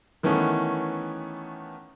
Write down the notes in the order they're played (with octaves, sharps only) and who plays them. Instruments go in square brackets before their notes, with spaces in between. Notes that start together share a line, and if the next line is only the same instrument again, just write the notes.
[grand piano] D#3 E3 A3 B3 C#4